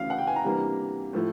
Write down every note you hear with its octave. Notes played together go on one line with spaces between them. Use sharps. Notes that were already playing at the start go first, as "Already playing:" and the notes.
Already playing: D2 C#3 E3 F5
F#5
G5
G#5
A#5
C3 E3 G3 A#3 D4
A2 F3 A3